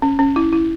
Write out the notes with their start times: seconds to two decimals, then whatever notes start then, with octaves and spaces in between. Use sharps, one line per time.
0.02 C#4
0.19 C#4
0.36 E4
0.53 E4